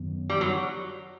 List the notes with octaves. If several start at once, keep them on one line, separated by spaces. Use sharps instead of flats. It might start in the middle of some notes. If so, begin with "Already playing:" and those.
Already playing: F#2 D#3 F#3 B3
G3
F#3